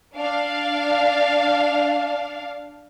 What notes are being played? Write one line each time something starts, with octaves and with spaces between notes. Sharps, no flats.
D4 F5